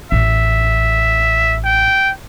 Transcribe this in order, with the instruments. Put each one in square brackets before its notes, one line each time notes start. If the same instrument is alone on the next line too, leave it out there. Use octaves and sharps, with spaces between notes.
[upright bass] A1 [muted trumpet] E5
[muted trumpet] G5